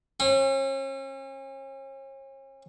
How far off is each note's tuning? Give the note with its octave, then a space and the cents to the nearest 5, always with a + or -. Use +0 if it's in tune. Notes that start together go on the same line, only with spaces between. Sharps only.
C#4 -40